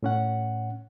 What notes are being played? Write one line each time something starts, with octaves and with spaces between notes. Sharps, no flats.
A2 C#4 F#5